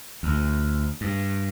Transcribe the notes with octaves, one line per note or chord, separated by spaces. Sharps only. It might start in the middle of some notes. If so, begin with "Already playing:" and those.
D2
G2